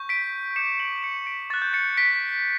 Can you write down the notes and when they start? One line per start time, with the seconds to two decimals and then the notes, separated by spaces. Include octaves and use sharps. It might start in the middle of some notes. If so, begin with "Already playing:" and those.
Already playing: C#6 G6
0.09 B6 D7
0.56 D6 G6 C#7 E7
0.80 D7 F#7
1.03 C#7 E7
1.26 B6 D7
1.50 C#6 F#6 A6
1.62 G6
1.73 A6 C#7
1.97 B6 D7